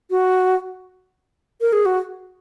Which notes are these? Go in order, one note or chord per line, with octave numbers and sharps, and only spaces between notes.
F#4
A#4
G#4
F#4